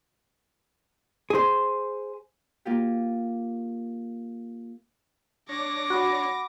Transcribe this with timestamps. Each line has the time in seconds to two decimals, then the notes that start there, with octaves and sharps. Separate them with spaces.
1.30 G#4 C5
2.65 A#3 F4 G4
5.49 D4 C#5 D6 A#6
5.90 F#4 F#5 B5 D#6